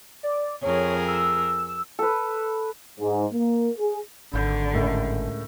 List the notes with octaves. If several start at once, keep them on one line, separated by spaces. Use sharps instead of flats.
D5
F2 G#4 A#4 C#5
E6
A4 B4
G#2
A#3
G#4
G#1 D3 B5 G6
C#2 A2 A#4